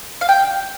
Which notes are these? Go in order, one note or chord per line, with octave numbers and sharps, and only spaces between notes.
F5
G5